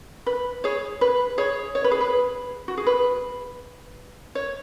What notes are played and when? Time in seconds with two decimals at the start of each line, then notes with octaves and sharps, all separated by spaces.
0.26 B4
0.64 G#4 C#5
1.01 B4
1.38 G#4 C#5
1.75 C#5
1.84 B4
1.91 G#4
2.01 B4
2.68 F#4
2.77 G#4
2.87 B4
4.35 C#5